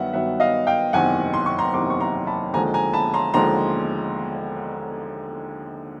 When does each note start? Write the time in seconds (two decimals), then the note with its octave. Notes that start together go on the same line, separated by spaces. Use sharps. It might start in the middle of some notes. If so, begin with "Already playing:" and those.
Already playing: G2 D#3 F#3 B3 E5 F#5
0.13 G2 D#3 F#3 B3 E5 F#5
0.40 D#5 F5
0.67 F5 G5
0.93 F#1 E2 C3 D#3 F#5 G#5
1.34 C6
1.46 C#6
1.59 A#5 C6
1.74 F#1 E2 C3 D#3 C6 D6
1.90 C#6
2.00 A#5 C6
2.27 A5 B5
2.53 D#2 D3 F3 G#3 G#5 A#5
2.74 G#5 A#5
2.93 A5 B5
3.14 A#5 C6
3.34 D#2 D3 F3 G#3 A#5 C6